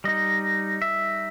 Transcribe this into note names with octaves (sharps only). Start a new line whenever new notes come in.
G3 D#4 D#5
E5